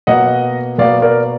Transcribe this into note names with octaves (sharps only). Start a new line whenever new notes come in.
B2 A#3 D#5 F#5
B2 A#3 D5 F5
A#4 D5